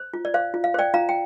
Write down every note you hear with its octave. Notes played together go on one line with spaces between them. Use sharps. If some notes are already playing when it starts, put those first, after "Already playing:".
Already playing: C5
F4
D5
C5 F5
F4
F5
C5 D5 G5
F4 F5 A#5
G5